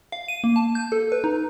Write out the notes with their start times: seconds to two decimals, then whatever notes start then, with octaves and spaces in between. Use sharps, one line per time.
0.12 F5
0.28 D#7
0.44 A#3
0.56 A5
0.75 G6
0.92 A4
1.12 B4
1.24 D#4